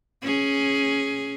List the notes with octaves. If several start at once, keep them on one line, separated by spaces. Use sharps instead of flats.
C#4 G#4